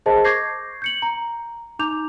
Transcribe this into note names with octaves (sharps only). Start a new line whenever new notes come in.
G#4 A#4 C5 D#5 A5
C#6 D6 G6 G#6 A#6 C7
G6 C#7 F#7
A#5
D#4 A#5 D6 G6 F7